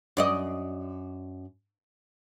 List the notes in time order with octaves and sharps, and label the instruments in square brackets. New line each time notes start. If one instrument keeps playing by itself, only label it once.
[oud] F#2 D5 D#5